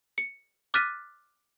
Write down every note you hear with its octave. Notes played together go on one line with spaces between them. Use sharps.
C#7
D6 F6 F#6 A6 B6 D#7